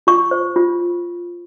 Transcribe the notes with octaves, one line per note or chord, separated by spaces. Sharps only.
F4 C#6
C5
F4